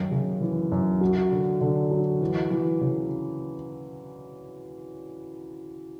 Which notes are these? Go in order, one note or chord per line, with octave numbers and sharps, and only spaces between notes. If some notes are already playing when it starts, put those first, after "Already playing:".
Already playing: F#2 D#3
C#3
E3
F#2
F#3
D3
D3
F#3
E3
E3
C#3